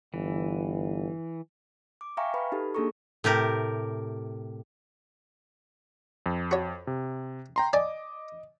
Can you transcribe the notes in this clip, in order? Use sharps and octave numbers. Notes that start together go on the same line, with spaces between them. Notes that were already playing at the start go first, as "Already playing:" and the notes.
G1 E3
D6
E5 F5 G5 G#5 A#5 C#6
B4 B5
D#4 G4 A4
A#3 D4 G#4 A4 A#5 C#6
A2 C3 G4 A#4
F2
F#4 C#5
C3
G5 A#5 C6
D5 D#5 G#5 A5 D6